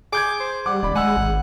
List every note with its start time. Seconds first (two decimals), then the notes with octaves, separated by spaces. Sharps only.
0.12 G#4 D6 G6 G#6
0.40 C5
0.66 G3 F#5 D6
0.83 D#1 D5 B5
0.96 G#3 F#5 G#5 B5 E6
1.17 G#1